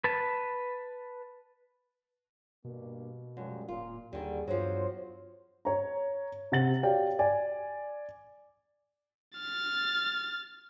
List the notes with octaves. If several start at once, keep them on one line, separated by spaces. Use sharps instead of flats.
B4 A5
G2 B2 A#3
F#2 F3 G3 G#3
D1 A#2 F4
D#2 D3 D#3 G3 G4 G#4
E2 G2 F3 F#3 C5
C#5 A#5
C3 F#5 A6 F#7
F#4 G4 C#5 D5 F5 G5
D5 G#5
F6 A6